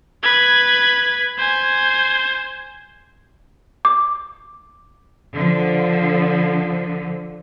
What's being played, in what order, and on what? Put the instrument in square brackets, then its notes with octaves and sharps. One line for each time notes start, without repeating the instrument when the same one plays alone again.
[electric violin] B4 G#6
C5 G#5
[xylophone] D6
[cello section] D3 F3